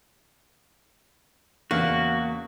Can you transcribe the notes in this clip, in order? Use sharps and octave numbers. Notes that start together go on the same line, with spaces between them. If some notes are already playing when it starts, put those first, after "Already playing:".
E2 C#3 A#3 F#4